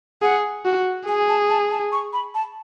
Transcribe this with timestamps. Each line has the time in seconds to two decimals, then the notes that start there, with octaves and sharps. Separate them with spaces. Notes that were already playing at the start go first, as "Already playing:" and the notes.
0.22 G#4 F#5
0.65 F#4
1.07 G#4 G#5
1.29 A5
1.50 A5
1.70 A5
1.92 C#6
2.13 B5
2.35 A5